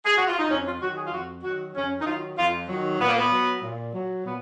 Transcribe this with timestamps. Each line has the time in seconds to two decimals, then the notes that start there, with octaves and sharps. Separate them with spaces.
0.05 G#4
0.17 F#4
0.27 F4
0.39 D#4
0.50 F2 C#4
0.66 F4
0.81 D#3 F#3 F#4
0.97 G#4
1.05 F4
1.12 F2 F#4
1.43 D#3 F#3 F#4
1.74 F2 C#4
2.01 D#4
2.05 D#3 F#3 F4
2.37 F2 F4
2.68 D#3 F#3
2.99 A#2 B3
3.08 A#3
3.18 B3
3.31 F#3
3.62 A#2
3.93 F#3
4.25 A#2 B3